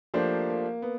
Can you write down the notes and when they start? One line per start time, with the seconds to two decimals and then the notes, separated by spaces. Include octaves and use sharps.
0.14 F3 A3 A#3 D4 G4 C5
0.50 A#3
0.82 B3